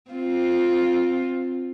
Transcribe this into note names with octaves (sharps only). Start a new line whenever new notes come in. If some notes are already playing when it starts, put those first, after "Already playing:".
C4 F4